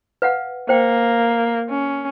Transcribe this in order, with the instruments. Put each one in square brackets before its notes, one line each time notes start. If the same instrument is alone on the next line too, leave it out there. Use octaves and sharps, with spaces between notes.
[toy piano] B4 F5 F#5
[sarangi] A#3 [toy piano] C5 G5
[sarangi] C#4